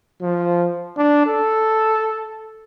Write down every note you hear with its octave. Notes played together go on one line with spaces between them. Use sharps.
F3
D4
A4